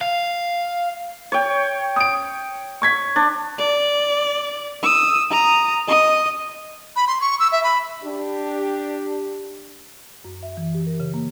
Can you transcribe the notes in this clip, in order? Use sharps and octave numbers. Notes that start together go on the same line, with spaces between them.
F5
C#5 G5
D#6 D7
C#6 G#6 B6
D4
D5
D#6 E6
A#5 D#6
D#5 D#6
B5
C6
C#6
E6
E5
B5
D4 G4
F#2
E5
E3
G4
A#4
C#3
A#3